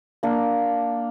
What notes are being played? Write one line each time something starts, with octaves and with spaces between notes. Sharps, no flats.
A#3 D4